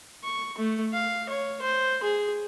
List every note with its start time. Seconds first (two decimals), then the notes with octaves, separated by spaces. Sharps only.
0.24 C#6
0.58 A3
0.93 F5
1.29 C#5
1.62 C5
2.03 G#4